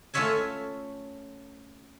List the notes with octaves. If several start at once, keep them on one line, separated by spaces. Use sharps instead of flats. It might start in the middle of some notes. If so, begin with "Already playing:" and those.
A3 C#4 F4 C#5 E5 G#5